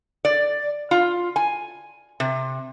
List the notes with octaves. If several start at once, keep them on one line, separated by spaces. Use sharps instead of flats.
D5
F4
G#5
C3